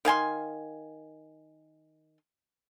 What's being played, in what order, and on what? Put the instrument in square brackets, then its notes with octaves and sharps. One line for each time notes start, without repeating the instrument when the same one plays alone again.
[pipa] D#3 F5 G#5 C6